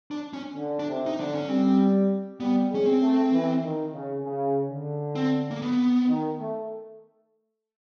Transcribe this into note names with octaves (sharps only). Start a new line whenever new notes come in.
D4
C#4
D3
D4
C3
D#4
D3 D4
C#4
G3 C4
G3 B3
G#3 C#4
C4
A3
E3
D#3
C#3
C#3
D3
C4
A#3
B3
D#3
A3